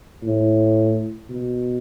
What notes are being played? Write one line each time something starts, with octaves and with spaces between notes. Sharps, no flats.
A2
B2